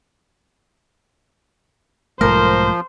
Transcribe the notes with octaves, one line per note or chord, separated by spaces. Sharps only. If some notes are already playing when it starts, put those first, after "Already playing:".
B1 G#2 F3 A3 A#4 C5